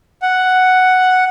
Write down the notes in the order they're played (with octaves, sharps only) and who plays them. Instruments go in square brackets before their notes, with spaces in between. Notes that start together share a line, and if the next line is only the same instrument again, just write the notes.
[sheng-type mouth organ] F#5